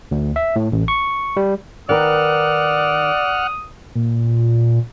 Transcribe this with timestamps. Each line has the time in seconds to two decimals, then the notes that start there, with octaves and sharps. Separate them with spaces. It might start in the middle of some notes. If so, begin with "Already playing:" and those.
0.11 D2
0.36 E5
0.56 A2
0.72 A1
0.88 C#6
1.37 G3
1.89 D#3 A#4 B4 D5 F#5 D#6 F6
3.95 A#2